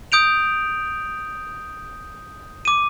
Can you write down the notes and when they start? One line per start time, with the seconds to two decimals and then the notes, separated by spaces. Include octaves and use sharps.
0.12 D#6 G6 D7 F7
2.65 D6 D#7